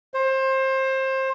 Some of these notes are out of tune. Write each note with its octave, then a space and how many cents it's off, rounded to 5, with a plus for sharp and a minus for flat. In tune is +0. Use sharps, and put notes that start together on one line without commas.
C5 +25